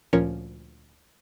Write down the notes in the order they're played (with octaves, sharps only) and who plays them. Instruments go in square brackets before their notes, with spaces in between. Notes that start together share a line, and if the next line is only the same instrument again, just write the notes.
[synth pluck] D2 A#2 F3 C#4 A#4 C#5